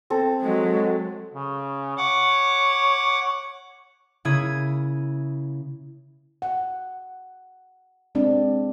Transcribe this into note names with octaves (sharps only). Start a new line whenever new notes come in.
C4 A4
F#3 G#3
C#3
C#5 F#5 D6
C#3 A#3 E4 D#6 G#6
F#5
G#3 C4 D4